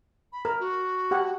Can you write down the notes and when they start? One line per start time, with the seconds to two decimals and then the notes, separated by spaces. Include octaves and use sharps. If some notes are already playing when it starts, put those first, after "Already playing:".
0.32 B5
0.45 A#4
0.60 F#4
1.11 G4 F#5